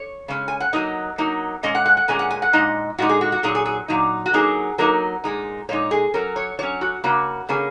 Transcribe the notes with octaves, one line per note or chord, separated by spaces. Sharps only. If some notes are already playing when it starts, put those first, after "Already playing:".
Already playing: C#5
C#3 G#3 C#4
G#5
F#5
F#3 A#3 D#4 D#5
F#3 A#3 D#4
A#2 G#3 C#4 D#5
F#5
F#5
F#5
A#2 G#3 C#4 G#5
F#5
G#5
F#5
A#2 G#3 D#4 D#5
A#2 G#3 D#4 F#4
G#4
F#4
F#4
A#2 F#3 D#4 G#4
G#4
G#4
A#2 F#3 D#4
F#4
F#3 A#3 D#4 G#4
F#3 A#3 D#4 A#4
A#2 G#3 D#4
A#2 G#3 D#4 C#5
G#4
F#3 C#4 A#4
C#5
F#3 C#4 C#5
F#4
C#3 A#3 C#4 F#4
C#3 A#3 C#4 G#4